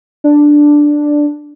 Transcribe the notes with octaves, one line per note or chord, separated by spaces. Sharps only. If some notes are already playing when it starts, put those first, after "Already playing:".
D4